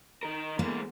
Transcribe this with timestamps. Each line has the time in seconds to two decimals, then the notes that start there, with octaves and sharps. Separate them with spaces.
0.23 D#3 A#4
0.59 B2 G#3 A#3